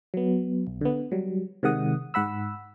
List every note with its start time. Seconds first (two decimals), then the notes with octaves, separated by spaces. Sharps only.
0.14 F#3 B3
0.67 B1
0.81 D3 B3
1.12 F#3 G3
1.63 C3 D#3 G#3 F#5 D#6
2.14 G#2 F#5 B5 E6